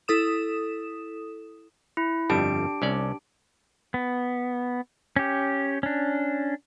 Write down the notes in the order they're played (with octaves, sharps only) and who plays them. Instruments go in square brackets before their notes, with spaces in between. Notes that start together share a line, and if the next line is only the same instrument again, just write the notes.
[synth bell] E4 A4 D#6 E7
[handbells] E4
[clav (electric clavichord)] G1 F2 G3 [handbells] D4 G4 D7
[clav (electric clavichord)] C2 C#4 D5
[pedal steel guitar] B3
C#4 G4
C#4 D4